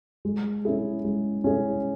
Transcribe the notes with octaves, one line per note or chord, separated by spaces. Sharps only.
G#3
C#4 E4 G#4
G#3
C#4 E4 G#4